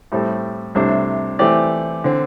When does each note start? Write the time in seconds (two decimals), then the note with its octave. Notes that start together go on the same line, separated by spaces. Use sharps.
0.12 A2 G3 C4 A4
0.75 C2 C3 A3 D4 C5
1.39 E3 A3 C4 G4 D5
2.04 D3 C4